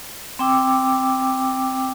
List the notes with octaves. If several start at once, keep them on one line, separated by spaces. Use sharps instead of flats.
C4 G5 D6 E6